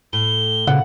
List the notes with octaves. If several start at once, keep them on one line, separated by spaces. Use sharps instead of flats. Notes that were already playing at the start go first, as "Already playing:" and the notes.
A2 G7
A#2 C#3 F#5